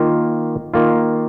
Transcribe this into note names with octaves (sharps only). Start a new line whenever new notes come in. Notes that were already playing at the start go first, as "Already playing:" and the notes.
Already playing: D#3 A#3 F4
D#3 A#3 F4